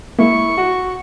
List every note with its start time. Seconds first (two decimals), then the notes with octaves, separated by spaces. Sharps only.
0.19 G#3 A#3 E4 C#6
0.58 F#4